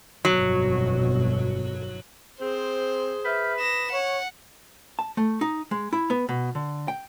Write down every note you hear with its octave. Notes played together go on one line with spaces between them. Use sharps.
G1 F2 B2 F#3
C4 G#4 C5
B4 E5 F6 G6
D#6 A#6 E7
C#5 F#5 C#6
A5
A3
D#4
G#3
E4
B3
B2
D3
G5